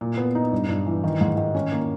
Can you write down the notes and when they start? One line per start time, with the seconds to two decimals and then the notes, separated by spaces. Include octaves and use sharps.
0.01 A#2
0.17 B3
0.35 D#4
0.52 G2
0.69 G2
0.86 E3
1.04 D#3
1.21 G#2
1.38 D#3
1.55 C#4
1.72 A#3